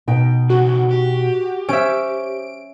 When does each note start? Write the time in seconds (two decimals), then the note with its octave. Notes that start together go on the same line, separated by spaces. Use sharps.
0.08 B2 D#4 G5
0.50 A2 C#3 F#4
0.91 G4
1.69 C#4 C5 E5 D7